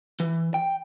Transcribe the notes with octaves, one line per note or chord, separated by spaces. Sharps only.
E3
G5